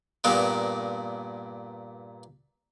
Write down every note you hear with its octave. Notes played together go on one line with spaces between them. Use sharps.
G2 A#2 A#3 B3